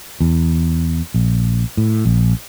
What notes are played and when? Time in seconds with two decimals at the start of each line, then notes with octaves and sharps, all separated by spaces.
0.21 E2
1.14 A#1
1.77 A2
2.05 A#1